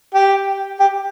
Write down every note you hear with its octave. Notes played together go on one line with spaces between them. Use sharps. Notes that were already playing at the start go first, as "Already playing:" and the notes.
G4
G4